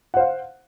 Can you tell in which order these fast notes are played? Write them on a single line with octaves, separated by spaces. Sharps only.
F#5 C5 F5